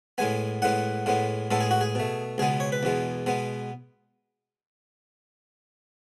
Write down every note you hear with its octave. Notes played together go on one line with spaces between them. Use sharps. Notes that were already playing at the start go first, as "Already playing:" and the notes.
A2 G#3 B3 G#5
A2 G#3 B3 F#5
A2 G#3 B3
A2 G#3 B3 A4
G#4
F#4
G#4
B2 A3
C#2 B2 G#3 B3 G#4
C#5
B4
E2 B2 G#3
B2 G#3 B3